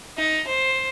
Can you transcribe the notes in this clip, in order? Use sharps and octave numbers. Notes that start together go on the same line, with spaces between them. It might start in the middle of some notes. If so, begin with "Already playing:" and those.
D#4
C5